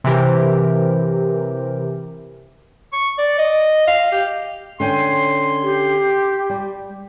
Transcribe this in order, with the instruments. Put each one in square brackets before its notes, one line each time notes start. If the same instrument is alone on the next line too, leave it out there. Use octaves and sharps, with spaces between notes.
[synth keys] C3 E3 G4 A#4
[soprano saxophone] C#6
D5
D#5
F5
G4
[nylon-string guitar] D3 C#4 G5 [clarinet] C6
[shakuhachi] G4
[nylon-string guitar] G3